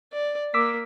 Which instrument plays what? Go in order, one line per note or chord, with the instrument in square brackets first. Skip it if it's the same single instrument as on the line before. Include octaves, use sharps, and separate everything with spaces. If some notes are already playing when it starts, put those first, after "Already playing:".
[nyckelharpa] D5
[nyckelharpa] A#3 [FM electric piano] D6 E6 B6